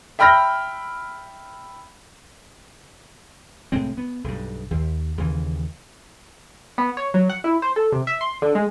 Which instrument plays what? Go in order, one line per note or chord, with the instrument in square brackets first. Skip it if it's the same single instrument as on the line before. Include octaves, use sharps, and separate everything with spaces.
[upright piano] E5 G5 B5 F6 G6 A#6
[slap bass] C2 A2 G#3 C4
B3
B1 G2
D#2
D#2 C#3 E3
[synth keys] B3
C#5
F#3
F#5
E4
C5
A4
C3
E5
C6
D3
G#3